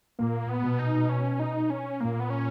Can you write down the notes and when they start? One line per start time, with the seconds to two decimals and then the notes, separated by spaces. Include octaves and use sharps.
0.18 A#2 A#3
0.49 B3
0.64 B2
0.79 D#4
1.09 C#4
1.40 D#4
1.70 C#4
2.01 A#2 A#3
2.20 B3
2.30 C#4